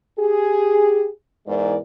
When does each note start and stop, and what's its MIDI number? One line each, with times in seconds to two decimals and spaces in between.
0.18 1.07 67
0.18 1.07 68
1.46 1.77 40
1.46 1.77 44
1.46 1.77 52
1.46 1.77 56
1.46 1.77 70
1.46 1.77 74